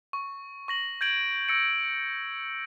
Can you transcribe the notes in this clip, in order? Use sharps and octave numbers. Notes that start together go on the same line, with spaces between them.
C#6
C#6 A#6 F#7
G6 G#6 D7 F#7
E6 A#6 C#7 D7